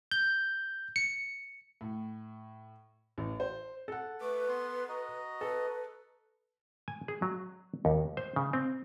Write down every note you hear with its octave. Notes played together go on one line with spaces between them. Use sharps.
G6
C#7
A2
A1
C5
A4 F#5
A3 B4 D6
B3 C6
F#4 D#5 A#5
A4 B4
G#5
G#4
F#3
D#2
C5
C#3
C4